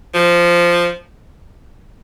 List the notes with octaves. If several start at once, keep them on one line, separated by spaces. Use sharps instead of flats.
F3